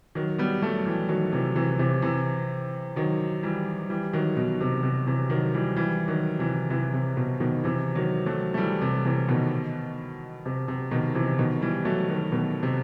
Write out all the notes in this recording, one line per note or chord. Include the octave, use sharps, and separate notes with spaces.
D#3 F#3
G3 B3
F#3 A3
E3 G3
D#3 F#3
C3 E3
C3 E3
C3 E3
C3 E3
D#3 F#3
E3 G3
E3 G3
D#3 F#3
B2 D#3
C3
C3
C3 E3
D#3 F#3
E3 G3
E3 G3
D#3 F#3
C3 E3
C3 E3
C3
B2
B2 D#3
C3 E3
D#3 F#3
F#3 A3
A3
E3 G3
C3
C3 E3
B2 D#3
C3
C3
B2 D#3
C3 E3
B2 D#3
E3 G3
F#3 A3
D#3 F#3
B2 D#3
C3